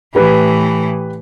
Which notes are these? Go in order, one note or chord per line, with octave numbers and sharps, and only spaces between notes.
A2 E3 G4 B4